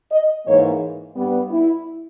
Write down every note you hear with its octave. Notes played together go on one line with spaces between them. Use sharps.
D#5
G#2 E3 A#3 C#5
G2 G3 B3
E4